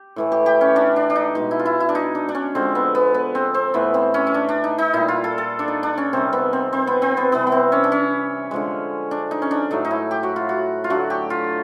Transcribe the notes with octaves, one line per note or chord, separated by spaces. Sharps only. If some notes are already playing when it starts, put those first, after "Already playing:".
Already playing: G4
A2 E3 A3
G4
G4
C#4
D4
D4
D4
D#4
B2 G#3 D#4
E4
F4
E4
E4
D4
D#4
D4
D4
C#4
D3 F3 G#3 C4
B3
B3
B3
C4
C4
A2 E3 A3 B3
C4
C#4
C#4
D4
D4
D#4
D#4
A#2 G3 E4
F4
A4
A4
D4
D#4
D4
C#4
C3 D#3 G3 C4
B3
C4
C4
B3
C4
B3
C3 E3 G3 B3
B3
C4
C#4
D4
C#4
D3 F3 G#3
D4
D#4
C#4
D4
A2 F#3 A3 D#4
D#4
E4
G4
F#4
F4
F#4
F4
D3 F#3 A3 F#4
G4
F4